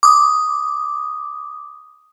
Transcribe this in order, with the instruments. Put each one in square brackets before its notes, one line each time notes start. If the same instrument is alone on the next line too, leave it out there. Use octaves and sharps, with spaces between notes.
[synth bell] D6 D#6